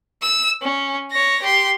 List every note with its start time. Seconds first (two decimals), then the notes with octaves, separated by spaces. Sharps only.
0.22 E6
0.62 C#4
1.11 C#5 A#6
1.42 G4 C6